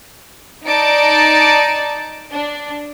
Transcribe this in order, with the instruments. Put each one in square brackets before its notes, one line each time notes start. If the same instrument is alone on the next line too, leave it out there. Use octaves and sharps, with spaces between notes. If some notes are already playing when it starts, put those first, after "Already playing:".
[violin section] D#4 D5 A5 D7
D4